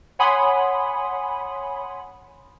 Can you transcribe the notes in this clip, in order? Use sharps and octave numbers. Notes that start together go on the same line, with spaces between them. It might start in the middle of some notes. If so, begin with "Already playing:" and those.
C#5 F#5 G#5 B5 C6 D#6